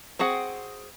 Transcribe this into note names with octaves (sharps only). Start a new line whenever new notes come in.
C4 F#4 G#4 F#5